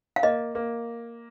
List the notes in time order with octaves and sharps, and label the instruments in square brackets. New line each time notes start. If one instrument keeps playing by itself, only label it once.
[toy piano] F5
[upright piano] A#3 [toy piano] D#5
[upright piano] A#3